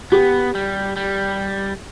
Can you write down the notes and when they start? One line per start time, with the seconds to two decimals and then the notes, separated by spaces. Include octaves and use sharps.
0.12 B3 G4
0.55 G3
0.97 G3